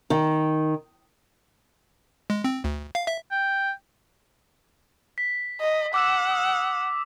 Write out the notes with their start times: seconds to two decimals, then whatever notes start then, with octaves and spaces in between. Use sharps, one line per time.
0.10 D#3
2.30 G#3
2.44 C4
2.64 D2
2.95 F5
3.07 E5
3.31 G5
5.18 B6
5.61 D#5
5.94 F#5 D6 E6 E7
6.31 D#6